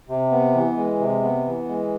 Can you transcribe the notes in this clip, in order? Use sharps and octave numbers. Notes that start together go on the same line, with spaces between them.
C3
B3
E3
G#3
C3
B3
E3
G#3